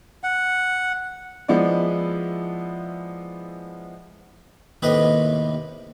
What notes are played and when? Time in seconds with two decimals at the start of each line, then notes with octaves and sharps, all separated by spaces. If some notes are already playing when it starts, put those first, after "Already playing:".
0.24 F#5
1.48 F3 G#3 B3 E4 D5
4.82 D#2 A2 C3 B3 B4 D#5